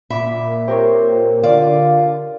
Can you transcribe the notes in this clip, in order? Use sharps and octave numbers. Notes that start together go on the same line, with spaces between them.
A#2 E5 B5 D6 B6
C4 G4 A#4 C#5
D3 F4 D5 F5 D6